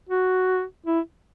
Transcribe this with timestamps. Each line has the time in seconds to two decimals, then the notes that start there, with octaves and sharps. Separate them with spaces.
0.09 F#4
0.86 E4